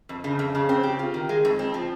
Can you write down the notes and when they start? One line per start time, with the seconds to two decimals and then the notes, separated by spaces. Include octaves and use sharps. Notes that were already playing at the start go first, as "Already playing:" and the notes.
0.09 F2
0.24 C#3
0.39 F2
0.55 C#3
0.69 C4
0.83 G4
0.99 F4
1.14 D#3
1.29 G#3
1.45 F2
1.59 C4
1.74 F3